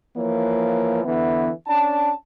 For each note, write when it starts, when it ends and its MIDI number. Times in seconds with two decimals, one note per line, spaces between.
0.17 1.03 52
0.17 1.03 53
0.17 1.03 58
0.17 1.03 73
1.05 1.50 50
1.05 1.50 52
1.05 1.50 59
1.05 1.50 76
1.67 2.11 61
1.67 2.11 62
1.67 2.11 81